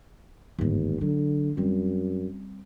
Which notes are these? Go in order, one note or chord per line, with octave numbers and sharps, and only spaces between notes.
G1 D#2 G#2
D3 F#3
F#2 G3 C4